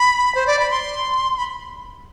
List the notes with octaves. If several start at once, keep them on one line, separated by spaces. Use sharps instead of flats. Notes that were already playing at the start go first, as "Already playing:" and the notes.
Already playing: B5
C5
D5
B5
C6
B5